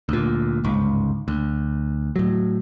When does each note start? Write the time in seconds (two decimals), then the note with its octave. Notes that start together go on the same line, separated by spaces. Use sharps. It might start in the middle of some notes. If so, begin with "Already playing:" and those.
0.09 D2 A#2
0.64 G1 C#2 G#2
1.28 D2
2.16 A2 F#3